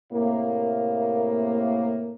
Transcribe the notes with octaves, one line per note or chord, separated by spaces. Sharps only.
A2 C3 A#3